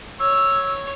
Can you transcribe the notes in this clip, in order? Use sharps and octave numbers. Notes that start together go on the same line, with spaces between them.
C#5 E6